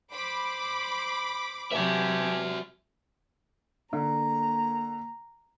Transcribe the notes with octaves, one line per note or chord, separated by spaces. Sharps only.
C5 B5 D6
C3 F#3 F#4 G4 E5 G#5 A5
D3 A#3 A#5